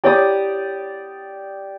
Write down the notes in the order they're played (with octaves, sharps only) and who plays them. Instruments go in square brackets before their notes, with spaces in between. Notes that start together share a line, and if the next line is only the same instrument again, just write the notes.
[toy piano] E4 C#5 [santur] G4 D5 D#6